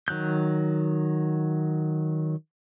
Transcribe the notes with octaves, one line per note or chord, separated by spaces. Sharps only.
D#3 F#3 F#6 G6